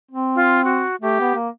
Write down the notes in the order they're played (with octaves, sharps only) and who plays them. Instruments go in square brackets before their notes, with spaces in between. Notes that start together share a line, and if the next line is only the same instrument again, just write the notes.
[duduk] C4
[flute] F4
F#4
[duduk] A3 [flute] G4
[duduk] B3
A#3